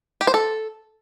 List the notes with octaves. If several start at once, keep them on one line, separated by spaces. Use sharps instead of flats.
G4
C5
A4